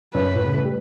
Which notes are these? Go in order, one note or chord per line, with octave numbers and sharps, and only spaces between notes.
F#2 B4
A2
C#3
A3
G3